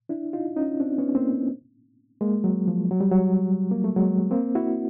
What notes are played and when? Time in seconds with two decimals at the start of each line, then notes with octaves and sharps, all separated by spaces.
0.09 D4 E4
0.33 D#4 F4
0.57 C#4 D#4
0.80 C4 D4
0.98 B3 C#4
1.15 A#3 C4
2.21 G#3 A#3
2.44 F#3
2.68 F3
2.91 F#3
3.01 G3
3.11 F#3
3.71 A#3
3.84 A3
3.96 F#3 G#3
4.31 A#3 C4
4.55 E4 F#4